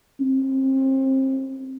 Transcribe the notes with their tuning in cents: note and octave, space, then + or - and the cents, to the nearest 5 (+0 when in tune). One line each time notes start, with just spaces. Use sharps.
C4 +30